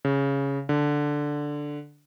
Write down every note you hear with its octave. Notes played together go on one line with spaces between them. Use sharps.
C#3
D3